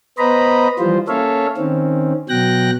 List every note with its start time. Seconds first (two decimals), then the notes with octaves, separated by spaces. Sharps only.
0.18 B3 B4 C5 D#5 A#5 B5
0.79 E3 F3 G3 F4 C5
1.08 A#3 C#4 A4 C#5 E5 F5
1.57 D#3 C4 C#4
2.29 B2 F#3 G5 F#6 A#6